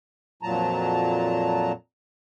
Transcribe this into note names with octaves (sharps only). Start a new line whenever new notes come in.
F2 A#2 F#3 A5 A#5